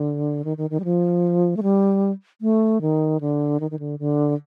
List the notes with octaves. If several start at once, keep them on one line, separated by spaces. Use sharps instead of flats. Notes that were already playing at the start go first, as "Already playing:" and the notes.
Already playing: D3
D#3
D#3
D#3
G3
F3
A3
G3
A3
D#3
D3
D#3
D#3
D3
D3